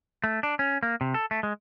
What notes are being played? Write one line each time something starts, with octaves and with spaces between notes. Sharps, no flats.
A3
D4
C#4
A#3
C3
A4
A3
G#3